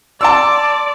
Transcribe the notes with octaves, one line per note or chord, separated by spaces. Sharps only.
D5 A5 C6 E6